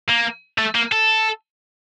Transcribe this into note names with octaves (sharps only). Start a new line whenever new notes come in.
A#3
A3
A#3
A4